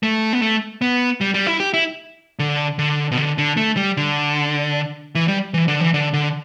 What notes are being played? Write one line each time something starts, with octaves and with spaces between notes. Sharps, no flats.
A3
B3
A3
B3
G3
G3
E4
G4
E4
D3
D3
B2
D3
D3
A3
G3
D3
E3
G3
E3
D3
E3
D3
D3